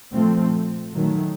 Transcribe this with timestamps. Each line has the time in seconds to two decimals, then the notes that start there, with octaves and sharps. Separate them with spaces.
0.13 A#2 F3 A3 C4
0.92 D#3 F#3 A3